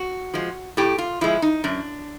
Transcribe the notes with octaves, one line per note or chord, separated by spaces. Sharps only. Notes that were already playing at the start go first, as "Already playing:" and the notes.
Already playing: F#4
F3 G#3
A2 G4
F4
F3 G#3 E4
D#4
F#2 D4